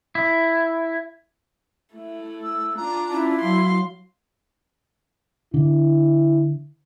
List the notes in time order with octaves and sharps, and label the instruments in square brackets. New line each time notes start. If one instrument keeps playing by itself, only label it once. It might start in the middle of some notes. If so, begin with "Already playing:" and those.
[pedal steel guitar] E4
[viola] A3 E4
[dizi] E6
[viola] D4 F4 [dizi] A#5
[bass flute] C#4 [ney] E4
[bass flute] F#3 [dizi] F5 [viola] C6
[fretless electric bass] D3 D4 [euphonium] E4